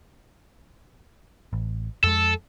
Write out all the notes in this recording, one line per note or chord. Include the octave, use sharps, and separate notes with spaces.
A1
F2 G#3 A4